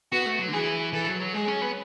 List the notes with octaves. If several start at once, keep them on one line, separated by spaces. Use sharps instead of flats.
B3 F#4
A3
F#3
D3
E3 G#4
E3 A4
F#3
F#3
G#3 G#4
C#4
B3